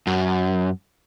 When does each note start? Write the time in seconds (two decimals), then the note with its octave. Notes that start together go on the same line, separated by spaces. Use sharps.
0.07 F#2